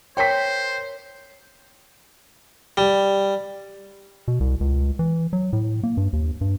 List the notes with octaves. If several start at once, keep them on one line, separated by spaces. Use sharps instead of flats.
A#4 C5 C#5 G5 C6 B6
G3
B2
C2
C#2
E3
F#3
A2
A#3
G2
D#2
G2